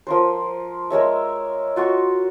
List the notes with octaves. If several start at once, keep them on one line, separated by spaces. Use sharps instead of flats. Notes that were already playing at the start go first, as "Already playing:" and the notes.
F3 A#4 C5
G#3 A#4 C#5 E5
F4 F#4 C6 C#6